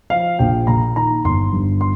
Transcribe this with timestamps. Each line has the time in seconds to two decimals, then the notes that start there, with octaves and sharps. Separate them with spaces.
0.10 F3 F5
0.39 A#1 G5
0.67 A#2 A#5
0.96 D#3 A#5
1.24 G1 C6
1.52 G2
1.81 C6